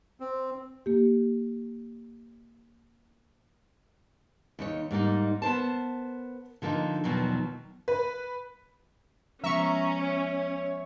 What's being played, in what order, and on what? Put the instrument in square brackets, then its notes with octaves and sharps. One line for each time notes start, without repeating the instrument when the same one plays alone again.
[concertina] C4
[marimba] A#3 G4
[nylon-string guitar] D#2 D#4 C#5
G#2 G3 A#3 D#4
B3 A#4 C5 A5
D3 F3 A#3 C#4 D#4
E2 B2 D#3 F3 F#3
[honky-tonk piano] B4
[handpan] F3 G#3 B3 [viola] C#4 [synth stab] E5 C#6 [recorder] A#5
[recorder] C#5